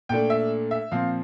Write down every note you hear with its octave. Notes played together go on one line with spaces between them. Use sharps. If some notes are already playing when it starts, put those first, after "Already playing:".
A#2 A3 D4 G5
E5
E5
A#2 F3 C4 F5